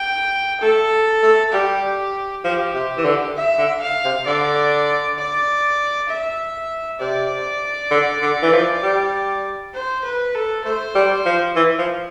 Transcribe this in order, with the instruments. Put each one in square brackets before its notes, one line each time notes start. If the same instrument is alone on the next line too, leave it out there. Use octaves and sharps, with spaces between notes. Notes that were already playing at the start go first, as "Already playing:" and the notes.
Already playing: [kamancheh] G5
[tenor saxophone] A3 [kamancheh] A4
[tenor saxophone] A3
[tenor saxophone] G3 [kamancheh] G4
[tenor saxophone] F3 [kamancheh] G4
[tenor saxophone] C3
E3
D3
[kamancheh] E5
[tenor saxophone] D3
[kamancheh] F5
[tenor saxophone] C3
[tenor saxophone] D3 [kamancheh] D5
[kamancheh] D5
E5
[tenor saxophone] C3 [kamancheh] D5
[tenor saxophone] D3
D3
E3
F3
G3
[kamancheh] C5
B4
A4
[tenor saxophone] A3 [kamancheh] C5
[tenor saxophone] G3
F3
E3
F3